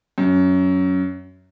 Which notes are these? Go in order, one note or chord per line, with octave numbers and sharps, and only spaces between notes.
F#2